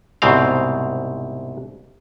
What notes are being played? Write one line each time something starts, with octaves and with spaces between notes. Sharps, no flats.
C2 G#2 B2 C4 F5